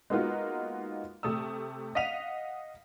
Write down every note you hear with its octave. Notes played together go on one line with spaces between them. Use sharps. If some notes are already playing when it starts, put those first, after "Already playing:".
G#3 A#3 B3 D#4 F4 F#4
C3 A3 D#6 E6
D#5 F5 F#5 B6 D#7 F7